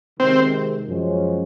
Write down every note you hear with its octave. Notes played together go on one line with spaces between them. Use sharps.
C3 D#3 G#3 C4
F#2 F3 G#3 C#4